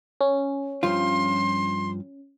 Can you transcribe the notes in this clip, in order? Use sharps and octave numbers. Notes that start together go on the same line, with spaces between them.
C#4
G2 F3 F4 C6